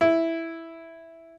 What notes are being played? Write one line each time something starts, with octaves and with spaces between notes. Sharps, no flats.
E4